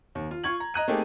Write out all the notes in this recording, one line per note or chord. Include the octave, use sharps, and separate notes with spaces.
D#2
F4
F4 C#6 G#6 F#7
A#5
D#5 A#5 F#6 D#7
A3 A#3 C4 D#4 G4 G#4